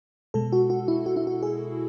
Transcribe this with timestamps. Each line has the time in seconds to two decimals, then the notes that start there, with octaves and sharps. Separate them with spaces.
0.34 B2 G#3 A4
0.52 F#4
0.70 F#4
0.88 E4
1.06 F#4
1.16 E4
1.27 F#4
1.43 G#4